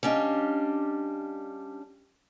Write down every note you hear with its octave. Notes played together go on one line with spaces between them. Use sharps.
G3 C#4 D4 D#5 F5